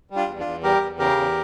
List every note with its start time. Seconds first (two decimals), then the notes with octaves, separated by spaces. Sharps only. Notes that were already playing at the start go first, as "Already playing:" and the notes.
0.10 G3
0.16 D4 F4
0.28 E2
0.40 D4 F4
0.46 E2
0.63 G3 G4 A#4
0.81 E2
0.99 C#3 G4 A#4
1.16 E2